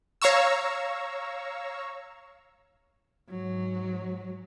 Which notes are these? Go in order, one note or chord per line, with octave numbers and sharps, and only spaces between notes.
C#5 F5 A#5 C#6 E6
G#2 F#3